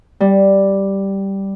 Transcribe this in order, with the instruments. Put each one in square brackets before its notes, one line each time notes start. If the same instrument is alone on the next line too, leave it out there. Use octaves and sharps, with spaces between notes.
[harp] G3